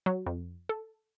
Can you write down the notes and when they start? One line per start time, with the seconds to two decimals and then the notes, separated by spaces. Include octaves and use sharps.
0.06 F#3
0.26 F2
0.69 A4